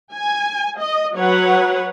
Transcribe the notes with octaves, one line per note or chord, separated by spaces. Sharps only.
G#5
D#5
F#3 B4 C#5 F#5